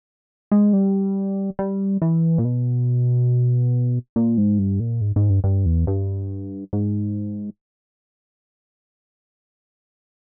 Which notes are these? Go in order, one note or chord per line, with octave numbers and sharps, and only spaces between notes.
G#3
G3
G3
E3
A#2
B2
A#2
G#2
G2
A#2
G#2
G#2
G2
G2
E2
G2
G#2